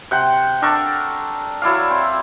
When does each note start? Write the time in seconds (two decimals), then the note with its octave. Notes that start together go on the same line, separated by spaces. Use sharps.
0.11 C3 F#5 G5 C6
0.62 D4 A4 A#4 C#6
1.62 F#3 E4 D5 F5
1.90 C4